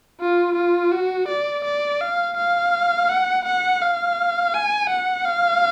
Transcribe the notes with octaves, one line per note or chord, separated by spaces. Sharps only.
F4
F4
F#4
D5
D5
F5
F5
F#5
F#5
F5
G#5
F#5
F5